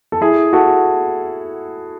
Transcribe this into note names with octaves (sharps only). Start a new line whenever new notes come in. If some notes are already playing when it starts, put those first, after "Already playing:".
A4
E4 G#4
F#4 A4